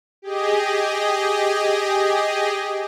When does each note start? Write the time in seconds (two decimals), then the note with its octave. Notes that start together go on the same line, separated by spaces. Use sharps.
0.22 G4 G#4 D#5